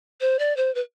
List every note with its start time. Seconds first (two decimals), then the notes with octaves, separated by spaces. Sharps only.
0.21 C5
0.39 D5
0.57 C5
0.75 B4